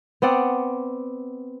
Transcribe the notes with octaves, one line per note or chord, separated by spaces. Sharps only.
B3 C4 D5 F#5